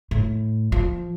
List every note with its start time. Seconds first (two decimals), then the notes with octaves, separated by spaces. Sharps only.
0.11 A2
0.72 F3